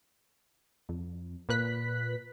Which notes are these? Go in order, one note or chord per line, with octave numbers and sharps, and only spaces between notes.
F2
A#2 B4 F#6 B6